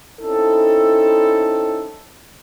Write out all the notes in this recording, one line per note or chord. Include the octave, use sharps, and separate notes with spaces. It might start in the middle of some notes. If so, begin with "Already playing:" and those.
C4 C#4 D#4 E4 A4